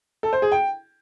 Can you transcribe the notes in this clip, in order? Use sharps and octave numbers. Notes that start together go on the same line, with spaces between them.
A4
C5
G#4
G5